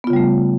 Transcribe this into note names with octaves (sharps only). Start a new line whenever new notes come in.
C#3 G3 A3 B3 F4